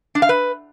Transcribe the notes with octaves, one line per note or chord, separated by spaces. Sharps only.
D4
F5
B4